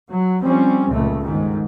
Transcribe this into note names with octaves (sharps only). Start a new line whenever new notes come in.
F#3
F3 G3 C4 C#4
F1 C#2 A#2 A3
G1 G#2 D#3